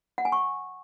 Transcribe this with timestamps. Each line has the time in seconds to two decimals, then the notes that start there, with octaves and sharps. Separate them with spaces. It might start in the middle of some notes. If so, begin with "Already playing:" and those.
0.18 F#5
0.25 G#5
0.32 C#6